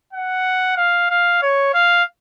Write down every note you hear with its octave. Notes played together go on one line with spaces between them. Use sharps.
F#5
F5
F5
C#5
F5